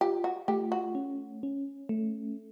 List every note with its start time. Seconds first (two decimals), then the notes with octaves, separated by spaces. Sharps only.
0.01 F4 G4
0.24 F#4
0.48 A3 G4
0.72 F#4
0.95 C#4
1.43 C#4
1.89 A3